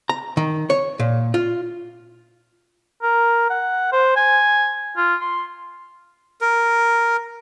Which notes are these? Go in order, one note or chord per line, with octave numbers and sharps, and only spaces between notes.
A#5
D#3
C#5
A#2
F4
A#4
F#5
C5
G#5
F4
C6
A#4